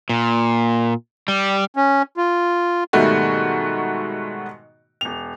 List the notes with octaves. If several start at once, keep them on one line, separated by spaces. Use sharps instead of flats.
A#2
G3
C#4
F4
G#2 B2 D#3 G3 A3 F#4
E1 F7